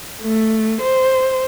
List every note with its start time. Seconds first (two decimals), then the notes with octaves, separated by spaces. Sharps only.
0.22 A3
0.81 C5